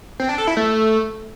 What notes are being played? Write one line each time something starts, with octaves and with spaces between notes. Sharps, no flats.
C4
D4
A4
E4
A3